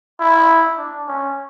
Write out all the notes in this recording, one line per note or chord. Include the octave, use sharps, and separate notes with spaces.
E4
D4
C#4